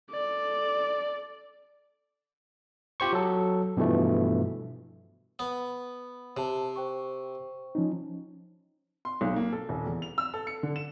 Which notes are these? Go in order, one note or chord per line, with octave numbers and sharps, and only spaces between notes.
A4 D5
F4 G4 C5 C#6
F#3 A4
G2 B2 E3 F3 A3
B3
C3 C5 A5
C5 G5 C#6
F3 C#4 D#4
C6
B1
A#3
A4
D#1
E2
F7
E6
A4
C#7
D3
E7